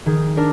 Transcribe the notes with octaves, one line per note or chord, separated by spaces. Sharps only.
D#3 G#4
D4 A#4